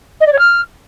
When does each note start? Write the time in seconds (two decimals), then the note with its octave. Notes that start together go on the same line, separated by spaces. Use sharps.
0.20 D#5
0.26 D5
0.32 C#5
0.38 F6